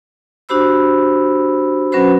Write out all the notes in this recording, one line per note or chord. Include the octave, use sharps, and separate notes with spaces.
D4 F#4 G4 C5 B5 E6
F#3 C#4 F#4 B4 C5 B5